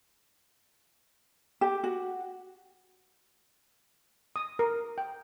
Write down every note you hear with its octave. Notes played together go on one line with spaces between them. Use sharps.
G4
F#4
D#6
A#4
G5